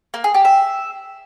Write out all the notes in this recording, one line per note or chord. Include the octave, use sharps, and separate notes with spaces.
A#3
G#4
G4
E5